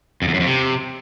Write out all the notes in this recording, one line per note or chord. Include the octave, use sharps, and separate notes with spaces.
F2
E2
F#2
F2
C3